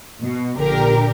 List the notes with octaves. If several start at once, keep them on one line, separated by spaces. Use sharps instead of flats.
B2
A#1 D3 G4 A#4